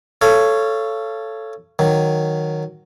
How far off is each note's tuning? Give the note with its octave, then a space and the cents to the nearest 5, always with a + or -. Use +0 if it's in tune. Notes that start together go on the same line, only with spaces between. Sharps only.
A4 +0 C#5 +0 F5 -30
D#3 +0 F#3 -5